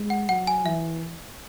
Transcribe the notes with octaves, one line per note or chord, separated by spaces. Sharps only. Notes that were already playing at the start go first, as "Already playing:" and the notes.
Already playing: G#3
F#5
F#3 F#5
G#5
E3 E5